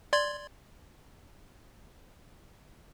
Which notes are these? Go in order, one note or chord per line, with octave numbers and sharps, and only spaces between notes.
D5 C6 G#6